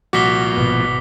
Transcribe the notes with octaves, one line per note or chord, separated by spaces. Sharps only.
C2 A#2 F3 F#4 D6 B6 G7
G#1 B2 B3